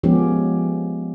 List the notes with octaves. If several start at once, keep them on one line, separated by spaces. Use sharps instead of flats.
F3 G#3 B3 C#4 G4